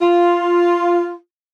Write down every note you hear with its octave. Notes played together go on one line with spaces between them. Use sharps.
F4